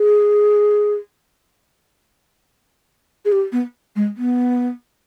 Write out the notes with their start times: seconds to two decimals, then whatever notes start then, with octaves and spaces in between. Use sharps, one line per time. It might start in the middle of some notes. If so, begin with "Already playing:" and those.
Already playing: G#4
3.25 G#4
3.32 G4
3.52 B3
3.96 G#3
4.17 B3